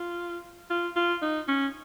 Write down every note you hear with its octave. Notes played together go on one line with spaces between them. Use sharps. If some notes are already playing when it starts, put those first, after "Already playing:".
Already playing: F4
F4
F4
D#4
C#4